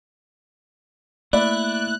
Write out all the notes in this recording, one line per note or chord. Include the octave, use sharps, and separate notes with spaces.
A3 A#3 E4 D5 B5 F#6